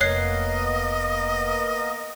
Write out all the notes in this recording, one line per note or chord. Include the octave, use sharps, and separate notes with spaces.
F1 A#3 B3 A#4 C#5 D#5 F#6 C7